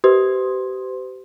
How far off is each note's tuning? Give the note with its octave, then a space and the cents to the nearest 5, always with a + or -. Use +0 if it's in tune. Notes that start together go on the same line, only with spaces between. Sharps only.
G4 -30 C5 -40 C6 +10